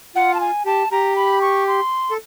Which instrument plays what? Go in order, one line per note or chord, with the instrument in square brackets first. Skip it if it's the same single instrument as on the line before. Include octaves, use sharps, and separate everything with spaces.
[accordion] F4 [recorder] F#5
[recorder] A5
G#5
[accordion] G4 [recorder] A5
[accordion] G4 [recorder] A#5
[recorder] B5
C#6
C6
[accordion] A4